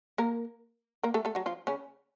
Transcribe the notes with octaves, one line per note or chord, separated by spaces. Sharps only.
A#3 A#4
A#3 A#4
A3 A4
A3 A4
F#3 F#4
F3 F4
C#3 C#4